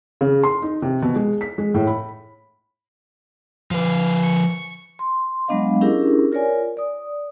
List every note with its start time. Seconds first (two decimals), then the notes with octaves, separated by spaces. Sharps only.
0.21 C#3
0.44 C6
0.62 D#4
0.82 C3
1.02 B2
1.15 G#3
1.41 B6
1.58 G#3
1.74 A2
1.87 B5
3.71 F3 B4 F5
4.24 C#6
4.99 C6
5.48 F#3 G#3 B3 D4 D#5 F5
5.81 C#4 D4 E4 G4 G#4 A#4
6.32 F4 A#4 C#5 D5 G#5
6.77 D5 D#6